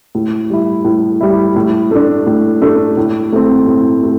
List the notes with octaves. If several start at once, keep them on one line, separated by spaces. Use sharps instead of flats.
A2
G3 E4
A2
G3 E4
A2
A3 D4
A2
A3 D4
A2
A3 C4
A2
A3